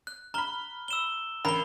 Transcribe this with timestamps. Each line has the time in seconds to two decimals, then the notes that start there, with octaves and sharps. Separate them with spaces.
0.07 F#6
0.34 A#5 B5 F6 G7
0.88 E6 E7 G7
1.45 A1 A#4 B5 G7